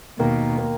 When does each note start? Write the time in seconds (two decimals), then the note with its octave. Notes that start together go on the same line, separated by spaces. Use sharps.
0.19 D#2 B2 D#3 A#3
0.57 D#3 A#3